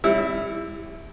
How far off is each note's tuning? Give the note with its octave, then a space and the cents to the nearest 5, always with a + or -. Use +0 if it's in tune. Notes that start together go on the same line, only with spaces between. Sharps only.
G3 +35 E4 +0